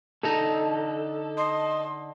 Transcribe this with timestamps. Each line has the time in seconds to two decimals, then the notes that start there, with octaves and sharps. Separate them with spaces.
0.23 D3 D#4 A4 A#5
1.37 D#5 C6